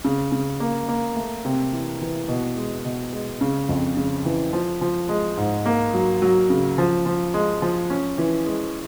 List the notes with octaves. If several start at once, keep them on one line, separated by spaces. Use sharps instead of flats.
C#3
C#3
A#3
A#3
A3
C3
E3
E3
B2
G#3
B2
G#3
C#3
F2
C#3
E3
F3
F3
G#3
G#2
A#3
F#3
F#3
C#3
F3
F3
G#3
F3
C#4
E3
G#3